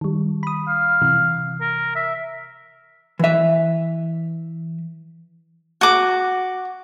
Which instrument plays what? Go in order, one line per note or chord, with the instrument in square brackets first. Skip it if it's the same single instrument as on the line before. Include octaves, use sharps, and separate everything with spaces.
[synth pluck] D#3 G3
B5 D#6
[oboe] F5
[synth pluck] C3 E3
[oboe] A#4
E5
[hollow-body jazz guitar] E3 E5
[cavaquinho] F#4 D6